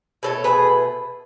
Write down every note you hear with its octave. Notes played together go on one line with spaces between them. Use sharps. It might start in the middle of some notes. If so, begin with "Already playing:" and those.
B2 A3 A4 C#5
G#4 B4